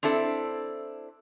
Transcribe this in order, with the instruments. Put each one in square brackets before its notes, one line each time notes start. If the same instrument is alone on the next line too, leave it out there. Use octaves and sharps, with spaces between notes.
[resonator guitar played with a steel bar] C4 D4 E4 A4